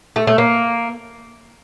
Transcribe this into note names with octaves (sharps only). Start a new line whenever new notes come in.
A3
A3
A#3